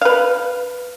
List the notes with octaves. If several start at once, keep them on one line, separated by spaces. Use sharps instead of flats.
B4 F5